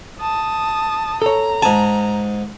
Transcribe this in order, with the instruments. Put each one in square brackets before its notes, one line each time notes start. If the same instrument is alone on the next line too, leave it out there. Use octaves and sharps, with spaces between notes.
[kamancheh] A5 D#6
[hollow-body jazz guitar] A4 C#5 [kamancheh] A#5
[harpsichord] G#2 G#5 [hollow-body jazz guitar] A5